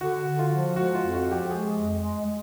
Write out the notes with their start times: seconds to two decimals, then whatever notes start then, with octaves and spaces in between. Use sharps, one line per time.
0.01 D3 F#4
0.26 D3
0.39 F4
0.50 F3
0.76 G#3 F#4
0.94 F4
1.00 F2
1.13 F#4
1.26 F3
1.31 G4
1.51 G#3 G#4
1.75 F2
2.00 G#3
2.26 G#3